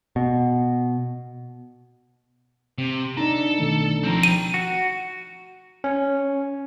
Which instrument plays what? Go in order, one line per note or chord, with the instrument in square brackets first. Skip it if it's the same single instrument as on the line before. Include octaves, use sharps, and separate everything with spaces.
[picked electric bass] B2
[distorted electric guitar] C3
[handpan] D4 D#4 [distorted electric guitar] A4 [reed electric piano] A#5
[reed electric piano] B2 D#3 A3
[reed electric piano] C#2 F3 A#5 [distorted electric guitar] C4 A#4
[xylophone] D#7
[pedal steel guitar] F#4
[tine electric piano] C#4